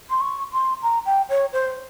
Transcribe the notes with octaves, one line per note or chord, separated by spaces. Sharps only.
C6
C#6
C6
A#5
G5
C#5
C5